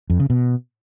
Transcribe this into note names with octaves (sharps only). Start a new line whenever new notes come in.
F2
C#3
B2